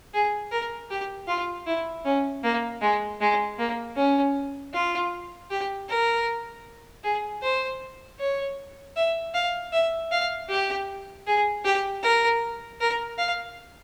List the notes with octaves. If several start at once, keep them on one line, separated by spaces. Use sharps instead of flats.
G#4
A#4
G4
F4
E4
C#4
A#3
G#3
G#3
A#3
C#4
F4
G4
A#4
G#4
C5
C#5
E5
F5
E5
F5
G4
G#4
G4
A#4
A#4
F5